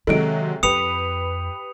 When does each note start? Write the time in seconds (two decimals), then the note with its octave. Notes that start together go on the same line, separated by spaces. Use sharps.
0.07 C3 D#3 F#3 G#3 A4 D7
0.63 F2 E4 G4 B4 D#6 C#7 F7